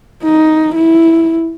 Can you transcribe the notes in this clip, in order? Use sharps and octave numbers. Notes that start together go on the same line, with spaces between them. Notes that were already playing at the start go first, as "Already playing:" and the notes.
D#4
E4